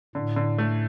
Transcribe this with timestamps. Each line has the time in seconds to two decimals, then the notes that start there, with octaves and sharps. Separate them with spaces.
0.15 A2 D3
0.36 D3
0.58 A3